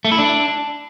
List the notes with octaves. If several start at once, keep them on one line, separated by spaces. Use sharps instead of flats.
A3
E4
D4